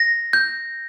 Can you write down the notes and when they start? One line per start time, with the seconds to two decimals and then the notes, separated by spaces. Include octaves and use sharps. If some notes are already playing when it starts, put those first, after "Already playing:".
Already playing: A#6
0.33 G6